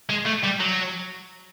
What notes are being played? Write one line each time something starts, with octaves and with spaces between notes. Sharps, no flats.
G#3
A3
G3
F#3